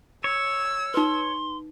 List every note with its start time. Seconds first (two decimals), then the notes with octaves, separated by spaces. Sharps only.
0.24 C#5 E6
0.94 D#4 B4 C6